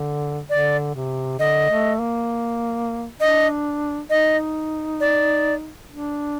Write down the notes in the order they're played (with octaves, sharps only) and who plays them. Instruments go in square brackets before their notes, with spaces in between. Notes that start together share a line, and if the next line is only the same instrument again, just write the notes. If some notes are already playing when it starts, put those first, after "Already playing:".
Already playing: [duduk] D3
[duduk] D3 [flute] D5
[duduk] C3
[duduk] D3 [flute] D#5
[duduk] A3
A#3
[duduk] D4 [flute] D#5
[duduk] D#4 [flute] D#5
[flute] D5
[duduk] D4